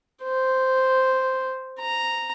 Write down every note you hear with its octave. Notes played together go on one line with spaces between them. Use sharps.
C5
A#5